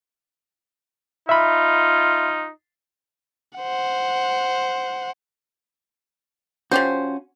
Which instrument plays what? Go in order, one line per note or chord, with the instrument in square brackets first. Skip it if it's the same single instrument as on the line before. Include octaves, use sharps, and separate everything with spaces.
[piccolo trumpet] D#4 [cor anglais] F4 [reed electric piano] E5 B5
[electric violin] C5 F#5
[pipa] F3 G4 C5 [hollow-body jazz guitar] C#4 F#4